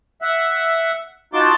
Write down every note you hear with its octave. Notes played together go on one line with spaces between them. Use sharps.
E5 F#5
D#4 F4 F#4 A5 C6 D6